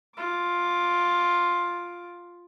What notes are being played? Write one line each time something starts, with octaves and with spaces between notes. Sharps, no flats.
F4 D6